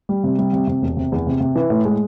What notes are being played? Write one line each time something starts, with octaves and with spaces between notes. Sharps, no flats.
G3
C3
G3
C3
C3
E1
C3
E2
C3
C3
E3
A2
G#3